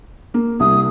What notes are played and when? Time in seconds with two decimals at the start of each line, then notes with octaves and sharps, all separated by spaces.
0.34 A#3
0.60 C2 D#6